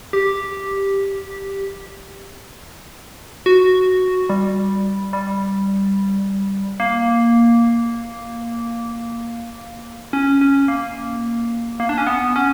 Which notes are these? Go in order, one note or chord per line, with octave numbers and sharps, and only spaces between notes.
G4
F#4
G3
G3
A#3
C#4
C#4
A#3
A#3
D4
C#4
B3
C#4